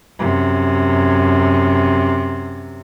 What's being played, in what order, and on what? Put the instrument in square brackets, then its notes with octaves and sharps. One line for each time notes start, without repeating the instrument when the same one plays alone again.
[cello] F#2 C3